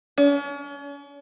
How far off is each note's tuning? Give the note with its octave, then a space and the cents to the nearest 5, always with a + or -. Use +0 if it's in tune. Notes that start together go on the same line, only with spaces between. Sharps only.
C#4 +40